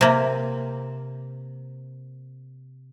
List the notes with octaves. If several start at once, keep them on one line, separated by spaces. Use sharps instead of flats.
C3 A#3